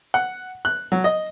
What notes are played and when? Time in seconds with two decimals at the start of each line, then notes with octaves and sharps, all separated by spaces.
0.14 F#5
0.65 F#6
0.92 F#3
1.04 D#5